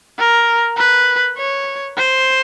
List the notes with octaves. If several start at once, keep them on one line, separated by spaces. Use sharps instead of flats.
A#4
B4
C#5
C5